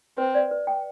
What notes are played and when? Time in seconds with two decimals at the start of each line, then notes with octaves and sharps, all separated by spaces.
0.18 C4 B4
0.34 D5
0.51 B4
0.67 G5